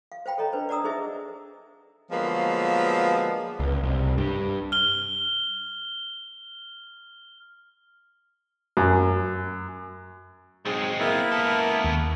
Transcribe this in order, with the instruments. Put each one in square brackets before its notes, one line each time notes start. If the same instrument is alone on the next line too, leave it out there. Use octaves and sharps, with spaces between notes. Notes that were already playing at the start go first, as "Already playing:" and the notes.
[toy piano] F5
C5 F5 G5 B5
A4 C#5 D#5 A#5
D4 B4 C5
D5 F#5 A5 A#5 D#6 E6
D#4 G#4 C5 D#5 E5
[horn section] D3 F3 F#3 G#3 A#3 B3
[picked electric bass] C#2
C2
G2
[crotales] F6 G7
[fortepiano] F#2
[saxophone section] G#2 G#3 [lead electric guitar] F#3 C4
[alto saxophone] A#3 [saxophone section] B3 E4
[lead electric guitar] C#3 A4
[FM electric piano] D#2